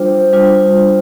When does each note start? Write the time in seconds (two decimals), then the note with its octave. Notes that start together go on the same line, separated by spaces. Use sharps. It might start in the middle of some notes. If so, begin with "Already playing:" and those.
Already playing: G3 D4 F4 C5
0.33 G3 D4 F4